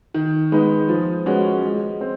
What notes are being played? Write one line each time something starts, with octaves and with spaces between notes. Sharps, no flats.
D#3
G#3 B3 D#4
F3
G#3 C#4 F#4 B4
G#3
C4